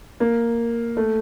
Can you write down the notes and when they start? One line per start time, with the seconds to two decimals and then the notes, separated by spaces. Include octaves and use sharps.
0.20 A#3
0.97 A3